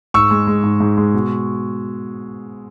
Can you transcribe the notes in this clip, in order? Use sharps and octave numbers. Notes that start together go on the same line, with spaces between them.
G#2 C#6 E6
G#3
G#3
G#2
G#2
G#3
B2